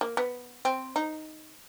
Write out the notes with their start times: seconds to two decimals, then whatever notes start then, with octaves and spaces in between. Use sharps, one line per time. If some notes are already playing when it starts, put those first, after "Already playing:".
0.01 A#3
0.17 B3
0.65 C4
0.96 D#4